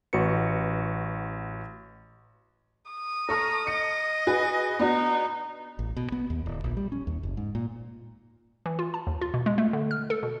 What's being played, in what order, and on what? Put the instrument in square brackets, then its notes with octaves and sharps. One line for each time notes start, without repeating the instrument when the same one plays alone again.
[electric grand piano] A1 F#4 B4 C#7
[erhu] D#6
[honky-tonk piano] A4 C#6 F6 [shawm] A#5
[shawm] D#5 [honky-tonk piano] C#7
[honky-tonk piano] F#4 G#4 B4
[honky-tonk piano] B3 D4 F#4 [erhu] D#4
[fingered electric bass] A1
B2
B3
D#2
D1
A#1
G3
C#4
D#2
F#1
G#2
A#2
[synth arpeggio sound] E3
F4
A5
D#2
F4
B2
G#3
A3
D3
F6
A4
B2